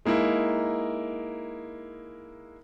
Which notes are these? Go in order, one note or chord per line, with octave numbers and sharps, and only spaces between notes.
G#3 A#3 D#4 E4